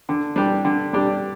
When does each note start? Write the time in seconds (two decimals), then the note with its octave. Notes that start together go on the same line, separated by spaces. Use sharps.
0.09 D3
0.36 G3 D4 G4
0.65 D3
0.93 G3 D4 G4